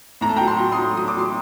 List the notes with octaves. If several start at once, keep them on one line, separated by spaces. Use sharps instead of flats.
A2 A#5
A5
G5 A#5
F#3
A5 C6
F#3
C6 D#6
F#3
F#3 D#6
D6
F#3 C6